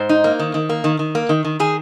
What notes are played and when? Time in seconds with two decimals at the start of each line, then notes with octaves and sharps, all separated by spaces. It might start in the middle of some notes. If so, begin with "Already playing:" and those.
Already playing: G#2 C5
0.09 D#4
0.24 A#3
0.39 D#3
0.54 D#3
0.69 A#3
0.84 D#3
0.99 D#3
1.15 A#3
1.29 D#3
1.44 D#3
1.60 D#3 G#4